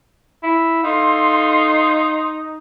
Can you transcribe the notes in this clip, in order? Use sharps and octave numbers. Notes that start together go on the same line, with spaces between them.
E4
D#4 A4 F5 C6